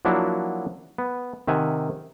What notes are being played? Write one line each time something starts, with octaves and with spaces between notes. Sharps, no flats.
F3 F#3 A#3 D4 E4 F#4
B3
C3 D#3 E5 F#5 G#5